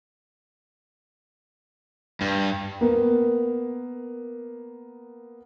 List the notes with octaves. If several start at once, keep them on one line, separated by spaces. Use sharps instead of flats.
G2
A#3 B3 A#4